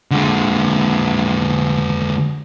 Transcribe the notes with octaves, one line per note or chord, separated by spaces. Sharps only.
D3 G#3